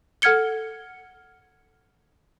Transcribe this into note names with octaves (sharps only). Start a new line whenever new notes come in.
A4 F#5 F6 G#6 C#7 G7